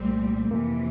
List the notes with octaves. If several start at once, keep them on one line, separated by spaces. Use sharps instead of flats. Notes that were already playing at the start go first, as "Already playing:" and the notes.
Already playing: C2 A#2 G3 A3 C4
F2 C3 E3 A#3